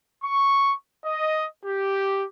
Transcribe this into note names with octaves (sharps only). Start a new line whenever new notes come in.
C#6
D#5
G4